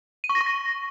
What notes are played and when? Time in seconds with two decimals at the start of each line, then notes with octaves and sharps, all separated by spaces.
0.24 D#7
0.29 C#6
0.35 A#6
0.41 C#6
0.46 A#6